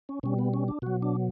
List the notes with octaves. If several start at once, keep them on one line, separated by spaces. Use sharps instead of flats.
C#4
B2 G3 C#4
B3
C#4
D4
B2 F#3 F#4
D4